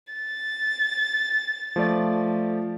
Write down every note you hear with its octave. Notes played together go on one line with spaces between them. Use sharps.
A6
F3 A3 D5